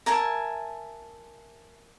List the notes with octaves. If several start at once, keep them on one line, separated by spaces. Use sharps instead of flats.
A#4 E5 G#5 A5